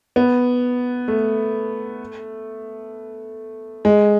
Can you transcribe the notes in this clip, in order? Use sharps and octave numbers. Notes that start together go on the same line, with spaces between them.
B3
A3
G#3